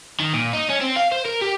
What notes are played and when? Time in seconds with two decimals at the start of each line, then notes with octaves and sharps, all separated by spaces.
0.20 D#3
0.33 A#2
0.53 D#4
0.70 C#4
0.81 C4
0.97 F5
1.12 C5
1.26 A#4
1.42 G4